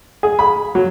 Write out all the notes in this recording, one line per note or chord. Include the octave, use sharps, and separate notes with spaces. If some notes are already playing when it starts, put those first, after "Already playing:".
G#4
B5
F#3